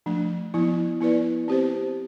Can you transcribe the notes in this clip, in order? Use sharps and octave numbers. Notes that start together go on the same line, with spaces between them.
F3 A3 D4
F3 B3 E4
B3 E4 B4 D5
C4 G4 C5